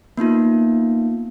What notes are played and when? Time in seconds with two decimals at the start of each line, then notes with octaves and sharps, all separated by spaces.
0.17 A#3 B3 D#4 F4